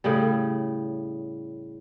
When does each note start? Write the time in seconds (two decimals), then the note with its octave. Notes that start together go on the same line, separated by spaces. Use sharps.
0.04 A2 C#3 G3